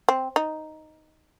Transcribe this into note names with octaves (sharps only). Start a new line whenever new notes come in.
C4
D#4